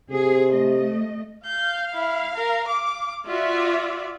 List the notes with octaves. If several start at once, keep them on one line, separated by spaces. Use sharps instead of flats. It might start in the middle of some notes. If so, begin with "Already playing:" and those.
C3 G#4
A3 D#5
F5 G6
E4
A#4
D6
F4 F#4 D5 E5